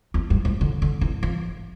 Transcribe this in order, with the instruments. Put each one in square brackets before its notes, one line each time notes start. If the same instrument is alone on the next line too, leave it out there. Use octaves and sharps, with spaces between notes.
[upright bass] E2
G2
A2
D3
D3
E3
F3